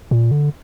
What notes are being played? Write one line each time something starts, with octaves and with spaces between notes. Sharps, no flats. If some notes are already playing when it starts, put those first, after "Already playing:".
A#2
D3